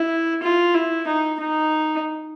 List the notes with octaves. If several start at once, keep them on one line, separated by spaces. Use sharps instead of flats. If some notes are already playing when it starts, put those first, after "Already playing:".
Already playing: E4
F4
E4
D#4
D#4